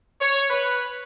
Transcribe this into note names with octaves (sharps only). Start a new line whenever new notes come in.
C#5
B4